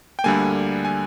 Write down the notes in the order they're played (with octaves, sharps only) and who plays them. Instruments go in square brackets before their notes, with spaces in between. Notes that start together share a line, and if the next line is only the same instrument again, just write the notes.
[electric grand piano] G5
D2 D3 G3 A#3 G#5
G#5